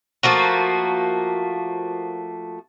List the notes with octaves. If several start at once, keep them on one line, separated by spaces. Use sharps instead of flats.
F3 A3 A#3 F#4